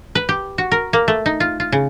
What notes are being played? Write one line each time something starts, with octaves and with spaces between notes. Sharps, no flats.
B4
G4
F#4
A#4
A#3
A3
D#4
F4
F4
C#3